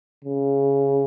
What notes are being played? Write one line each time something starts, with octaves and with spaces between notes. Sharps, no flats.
C#3